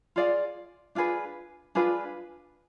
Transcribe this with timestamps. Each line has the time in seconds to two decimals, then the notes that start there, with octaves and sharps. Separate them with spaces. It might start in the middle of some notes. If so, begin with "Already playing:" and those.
0.16 F4 G#4 D5 F5
0.95 D4 F4 G#4 B4
1.75 D4 F4 G#4 B4